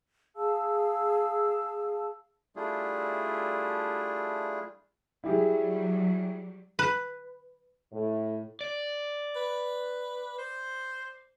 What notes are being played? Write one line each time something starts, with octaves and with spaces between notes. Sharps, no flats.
G#4 F5 A5 E6
G3 A3 D4 E4 F4 G#4
F#3 G3 E4 G4 G#4
B4
A2
D5
B4
C5